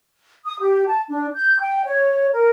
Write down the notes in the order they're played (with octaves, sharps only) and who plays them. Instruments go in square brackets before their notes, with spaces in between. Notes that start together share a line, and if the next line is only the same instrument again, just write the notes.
[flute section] D#6
G4
A5
D4
G6
G5
C#5
A#4